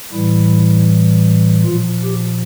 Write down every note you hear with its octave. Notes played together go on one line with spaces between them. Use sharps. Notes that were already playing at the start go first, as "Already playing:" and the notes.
A2 E3 G3 E4
A#2 F3 F4
G4